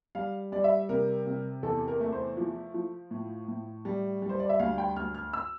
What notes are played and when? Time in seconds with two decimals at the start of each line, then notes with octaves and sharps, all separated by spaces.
0.15 G3 F5
0.52 G3 D5
0.64 E5
0.89 C3 A#4
1.26 C3
1.63 E2 A4
1.88 A#4
2.00 A3
2.12 C5
2.37 F3
2.74 F3
3.11 A2
3.48 A2
3.85 G3
4.22 G3
4.29 C5
4.40 D5
4.49 E5
4.59 D2 F5
4.78 G5
4.96 D2 F6
5.15 F6
5.33 E6